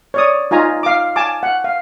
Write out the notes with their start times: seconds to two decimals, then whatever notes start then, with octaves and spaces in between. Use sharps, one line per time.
0.14 C#5 D5 D#6
0.51 D#4 F4 G#5 A#5
0.83 F5 D6
1.16 G#5 A5 D6
1.43 F#5
1.64 F5